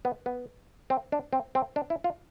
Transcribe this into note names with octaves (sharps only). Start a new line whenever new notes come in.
B3
B3
C4
D4
C4
C4
D4
E4
F4